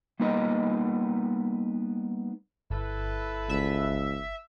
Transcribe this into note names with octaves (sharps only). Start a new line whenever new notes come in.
G3 A#3 B3 D#4 A#4 D#5
G1 E4 A4 B4
C#2 E5